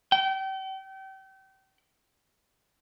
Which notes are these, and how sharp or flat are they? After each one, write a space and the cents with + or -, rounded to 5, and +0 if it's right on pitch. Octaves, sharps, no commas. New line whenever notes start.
G5 -35